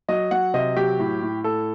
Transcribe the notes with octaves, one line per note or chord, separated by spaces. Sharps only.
F#3 D#5
F#3 F#5
C3 D#5
F#3 G4
A2
A2
A2 A4